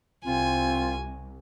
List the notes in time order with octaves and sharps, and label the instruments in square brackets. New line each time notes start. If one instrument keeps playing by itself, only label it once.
[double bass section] C2 C3 [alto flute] C4 [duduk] F4 [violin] G#5